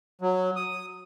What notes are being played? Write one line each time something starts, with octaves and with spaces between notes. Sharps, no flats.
F#3
D#6